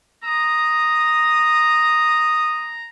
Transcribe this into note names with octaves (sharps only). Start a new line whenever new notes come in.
A#5 D#6